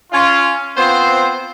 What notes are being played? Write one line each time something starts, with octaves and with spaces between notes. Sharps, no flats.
C#4 F4
B3 C4 F4 C5